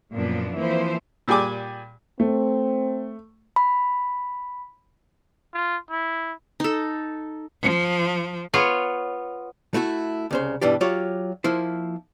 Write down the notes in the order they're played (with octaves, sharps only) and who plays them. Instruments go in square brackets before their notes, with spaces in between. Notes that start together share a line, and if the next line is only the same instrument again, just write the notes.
[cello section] F#2 A#2 F3 B3 D4
E3 F3 A#3 C4 C5
[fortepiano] A#2 G3 G#4 G5 G#5 D6
[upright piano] A3 [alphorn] C4
[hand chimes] B5
[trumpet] F4
E4
[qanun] D#4 A4
[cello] F3
[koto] B3 F4 C#5
[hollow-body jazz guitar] A3 E4 F#4 G4 A4
C2 C#3 C5
G2 B2 E3 D4 G4
F#3 F4 G4 C#5
F3 A#3 E4 C5